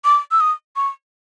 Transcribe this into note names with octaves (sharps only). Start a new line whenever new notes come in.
D6
E6
D#6
C#6